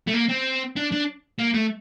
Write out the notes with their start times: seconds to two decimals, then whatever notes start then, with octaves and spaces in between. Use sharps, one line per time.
0.07 A3
0.13 A#3
0.29 C4
0.76 D4
0.92 D4
1.39 A#3
1.54 A3